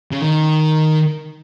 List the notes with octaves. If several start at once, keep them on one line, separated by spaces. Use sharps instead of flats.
C#3
D#3